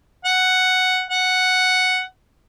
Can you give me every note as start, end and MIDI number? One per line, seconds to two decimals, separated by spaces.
0.25 1.03 78
1.11 2.02 78